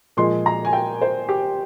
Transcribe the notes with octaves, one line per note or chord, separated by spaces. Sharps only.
A#2 F3 G#3 C6
A#5
G#5
G5
C5
G4